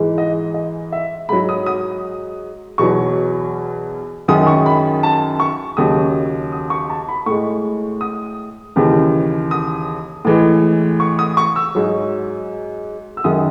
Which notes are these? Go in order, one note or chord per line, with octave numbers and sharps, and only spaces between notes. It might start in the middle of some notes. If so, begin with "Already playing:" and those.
Already playing: G#2 E3 G#3
D#5
D#5
E5
G#2 F#3 B5
D#6
D#6
E2 B2 F#3 C#6
F#2 D#3 G#3 D#6
C#6
B5
A5
C#6
D#2 C#3 F#3 D#6
D#6
C#6
A5
B5
A2 G#3 C#6
D#6
D#2 C#3 E3
D#6
A2 E3 G#3
C#6
D#6
C#6
E6
G#2 F#3
E6
F#2 D#3 G#3 D#6